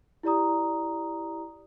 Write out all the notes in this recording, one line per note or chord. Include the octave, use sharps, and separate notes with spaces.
E4 G4 D5 A#5 D#6